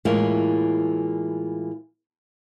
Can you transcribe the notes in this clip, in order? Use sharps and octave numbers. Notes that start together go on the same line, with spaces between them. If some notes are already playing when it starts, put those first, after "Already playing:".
A2 E3 G#3 A#3 F4